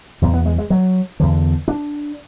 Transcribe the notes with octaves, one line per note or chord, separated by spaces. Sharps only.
E2 B2
B3
G#3
G#3
F#3
E2 D3
D4